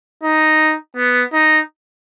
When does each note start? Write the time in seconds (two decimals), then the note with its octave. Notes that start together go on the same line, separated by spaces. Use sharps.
0.23 D#4
0.97 B3
1.33 D#4